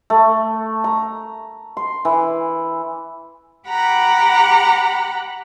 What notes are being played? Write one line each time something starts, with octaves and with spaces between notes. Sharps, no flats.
A3
A#5
C6
E3
G4 F#5 A#5 B5